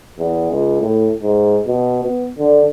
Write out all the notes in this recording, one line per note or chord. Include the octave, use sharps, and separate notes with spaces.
E2
C#2
A2
G#2
B2
B3
D3